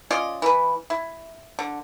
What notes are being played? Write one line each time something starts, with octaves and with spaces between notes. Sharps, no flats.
C#4 F4 D5 D#5
E3 B4
E4
D3